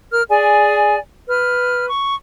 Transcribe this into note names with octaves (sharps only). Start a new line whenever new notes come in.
A#4 F6
G#4 D5 G#5
B4 F6
C#6